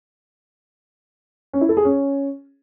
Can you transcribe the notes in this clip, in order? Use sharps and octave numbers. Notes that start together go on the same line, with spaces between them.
C#4
E4
A4
G#4
C#4